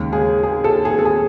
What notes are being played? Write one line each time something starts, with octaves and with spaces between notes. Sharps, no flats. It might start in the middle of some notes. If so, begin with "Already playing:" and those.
Already playing: D#2 C#3 G#3
G#4
G#4
A4
G#4
A4
G#4